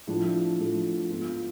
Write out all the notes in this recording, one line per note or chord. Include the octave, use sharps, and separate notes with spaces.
A2 F3 A3 D4
A2 F3 A3 D4
G#2 G#3 B3 F4